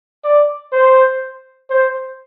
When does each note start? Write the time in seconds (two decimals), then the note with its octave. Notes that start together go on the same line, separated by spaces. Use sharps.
0.24 D5
0.72 C5
1.70 C5